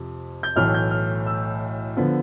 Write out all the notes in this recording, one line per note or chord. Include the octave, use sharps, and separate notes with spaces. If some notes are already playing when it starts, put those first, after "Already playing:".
Already playing: F2 C3
G6
B1 A2 E3 A3 F6
G6
F6
E6
D3 F3 B3